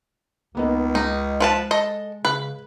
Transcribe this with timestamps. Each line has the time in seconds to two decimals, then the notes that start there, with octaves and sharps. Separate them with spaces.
0.55 C#2 A#3 B3 D#4
0.95 G#3 D#4
1.40 F3 B4 A5
1.71 A4 D#5
2.25 C#3 B4